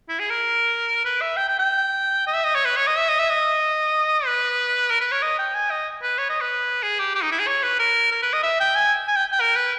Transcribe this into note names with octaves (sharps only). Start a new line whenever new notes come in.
E4
G#4
A#4
B4
E5
G5
G5
G5
D#5
E5
D#5
C#5
B4
C#5
D#5
E5
D#5
E5
D#5
B4
A#4
B4
C#5
D#5
G5
G#5
D#5
B4
C#5
D#5
B4
G#4
G4
G4
D#4
E4
G#4
C#5
B4
A#4
A#4
B4
D#5
E5
G5
G#5
G#5
G5
G5
A#4
B4